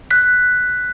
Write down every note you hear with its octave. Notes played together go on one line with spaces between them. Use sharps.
F#6 B6